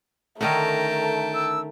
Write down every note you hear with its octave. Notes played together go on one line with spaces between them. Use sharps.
D3 D#3 A3 C#4 A#4 G5 A5 A#5
E6